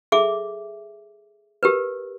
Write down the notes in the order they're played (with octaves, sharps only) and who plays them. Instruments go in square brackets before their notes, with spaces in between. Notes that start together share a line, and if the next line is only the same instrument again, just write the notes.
[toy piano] G#4 A4 E5 D6
G4 A#4 B4